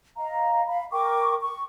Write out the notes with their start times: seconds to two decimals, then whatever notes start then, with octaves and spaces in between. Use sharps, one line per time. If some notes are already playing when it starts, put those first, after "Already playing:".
0.17 D#5 F5 A#5
0.68 F5 B5
0.92 A#4 G5 C#6 D6
1.41 C#6